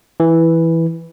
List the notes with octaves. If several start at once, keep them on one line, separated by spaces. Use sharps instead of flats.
E3